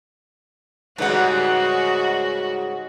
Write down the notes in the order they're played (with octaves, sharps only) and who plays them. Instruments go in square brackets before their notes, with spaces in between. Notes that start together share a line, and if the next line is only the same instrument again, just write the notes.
[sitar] G#2 C#3 G3 [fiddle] F#4 [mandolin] B4 F#5